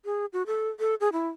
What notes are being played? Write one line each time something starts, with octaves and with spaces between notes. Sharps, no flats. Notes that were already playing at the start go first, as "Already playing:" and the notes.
G#4
F#4
A4
A4
G#4
E4